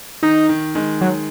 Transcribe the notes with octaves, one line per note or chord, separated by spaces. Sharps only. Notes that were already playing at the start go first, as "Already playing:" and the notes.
D#3 D#4
D#3
D#3 G#3
F#3